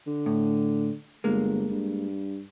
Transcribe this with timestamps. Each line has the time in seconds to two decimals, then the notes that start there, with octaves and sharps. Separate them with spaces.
0.07 D3
0.26 A2
1.24 G1 G#3 A#3
1.70 G2